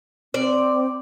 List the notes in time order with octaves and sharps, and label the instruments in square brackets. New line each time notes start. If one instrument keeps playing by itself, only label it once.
[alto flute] C4 [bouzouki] D5